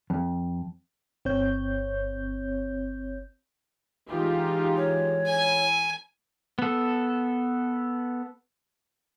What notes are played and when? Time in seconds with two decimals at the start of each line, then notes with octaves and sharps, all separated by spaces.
0.10 F2
1.25 G1 C4 C#5 G6
4.08 E3 G#3 D#4 F4 G4
4.77 C#5
5.27 E4 G#5
6.59 B3 A4